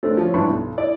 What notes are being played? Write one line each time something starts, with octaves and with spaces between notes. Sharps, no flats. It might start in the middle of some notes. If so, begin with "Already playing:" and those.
A3 C4 D4 A#4
F3 C#4
G2 E3 D4 B4 B5 C#6
B1
E4 D5 D#5